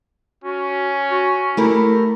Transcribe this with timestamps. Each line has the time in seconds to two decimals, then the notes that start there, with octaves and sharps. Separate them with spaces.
0.44 C#4 F#4
1.11 F#4
1.57 A3 E4 G4 A#4